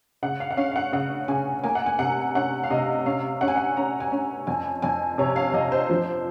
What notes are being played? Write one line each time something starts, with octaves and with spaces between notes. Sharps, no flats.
C#3 F#5
F5
F#5
C#4 F5
F5
F#5
C#3 F#5
C#3 G#5
A#3 G#5
F#5
G#5
C3 F#5
C#4 F#5
F5
C3 D#5
C#4 F5
C#4 F#5
G#5
F#5
C#4 A#5
G#5
C#4
F2 G#5
F2 G#5
C3 C#5
F5
F2 D#5
C5
F3